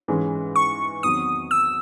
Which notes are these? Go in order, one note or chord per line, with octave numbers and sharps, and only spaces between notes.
G#2 E3 G#3 C#4
C#6
E2 D#3 F#3 C4 F#4 D#6
E6